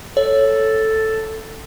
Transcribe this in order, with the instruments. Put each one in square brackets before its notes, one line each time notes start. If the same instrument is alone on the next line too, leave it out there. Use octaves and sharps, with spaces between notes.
[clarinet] A4 [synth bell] C#5